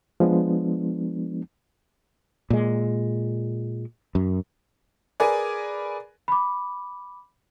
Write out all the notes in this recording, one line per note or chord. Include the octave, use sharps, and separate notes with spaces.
F3 G#3 B3 D4
A#2 G#3
F#2
G#4 A#4 B4 D5 G#5
B5 D6